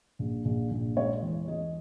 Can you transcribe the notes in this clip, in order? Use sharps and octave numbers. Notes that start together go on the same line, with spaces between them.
A#1
A#1
A#1
G#3 C#5
E2
G#3 D#5